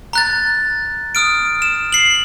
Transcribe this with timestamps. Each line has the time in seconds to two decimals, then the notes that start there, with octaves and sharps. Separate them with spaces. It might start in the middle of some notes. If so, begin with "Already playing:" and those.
0.13 A#5 F#6 A6
1.15 D#6 F6 D7
1.62 E7
1.93 C7 F#7